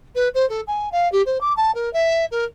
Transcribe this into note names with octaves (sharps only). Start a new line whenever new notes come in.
B4
C5
A4
G#5
F5
G4
C5
D6
A5
A#4
E5
A#4